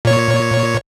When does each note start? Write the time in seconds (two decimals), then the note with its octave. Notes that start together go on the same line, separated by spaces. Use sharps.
0.05 A#2 C#5